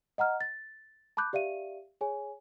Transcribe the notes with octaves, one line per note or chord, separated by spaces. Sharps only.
D#5 F#5 A#5 F6
A6
A5 B5 D6 F#6 G6
G4 D5 E5 F5 D#7
G#4 C#5 G#5